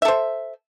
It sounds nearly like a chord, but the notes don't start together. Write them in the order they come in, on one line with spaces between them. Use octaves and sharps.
E5 A4 C5